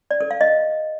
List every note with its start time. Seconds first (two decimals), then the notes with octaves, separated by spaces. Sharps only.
0.11 D5
0.21 A4
0.31 F5
0.41 D#5